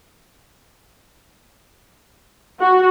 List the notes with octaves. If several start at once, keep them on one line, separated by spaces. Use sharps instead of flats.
F#4